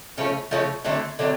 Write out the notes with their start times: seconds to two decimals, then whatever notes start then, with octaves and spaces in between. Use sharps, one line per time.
0.18 C#3 F3 A3 C#4
0.51 C#3 F3 A3 C#4
0.84 D3 F#3 A3 C4
1.19 D3 F#3 A3 C4